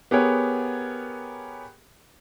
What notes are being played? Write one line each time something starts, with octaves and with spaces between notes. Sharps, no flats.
B3 G4 G#4 A#4 C#5